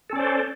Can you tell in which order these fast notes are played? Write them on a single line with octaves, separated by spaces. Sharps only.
A4 C#4 D5 C5